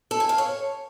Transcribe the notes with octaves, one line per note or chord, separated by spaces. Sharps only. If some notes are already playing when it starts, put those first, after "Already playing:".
A4
G#5
F5
C#5